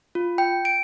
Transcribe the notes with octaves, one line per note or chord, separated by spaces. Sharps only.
F4
G5
D7